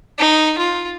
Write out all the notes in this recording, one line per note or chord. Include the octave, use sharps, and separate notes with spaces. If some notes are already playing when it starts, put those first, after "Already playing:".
D#4
F4